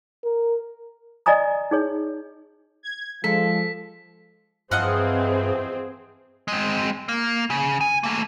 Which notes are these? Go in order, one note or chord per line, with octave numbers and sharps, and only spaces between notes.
A#4
D5 D#5 G#5 A#5 D#6
D#4 G#4 C#5
G#6
F3 G#3 A4 B6
G2 E3 F3 C4 G#4 D#5 F5 F#5
G#3 C4
A#3
C#3
G#5
A3 A#3